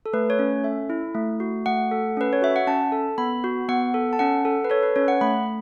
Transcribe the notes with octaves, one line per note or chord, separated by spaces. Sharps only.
A4
A3 B4
C#5
C#4
A4 E5
E4
A3
F#4
A3 F#5
A4
C#4 B4
C#5
F#4 E5
F#5
C#4 A5
A4
B3 B5
F#4
B3 F#5
A4
A5
C#4 F#5
A4
B4
A4 C#5
B4
C#4 C#5
F#5
A3 B5